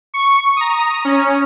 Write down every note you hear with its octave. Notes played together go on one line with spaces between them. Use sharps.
C#6
A#5 D#6
C#4